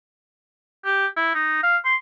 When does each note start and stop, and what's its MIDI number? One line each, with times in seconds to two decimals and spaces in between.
0.85 1.06 67
1.17 1.31 64
1.35 1.61 63
1.63 1.77 77
1.85 1.96 84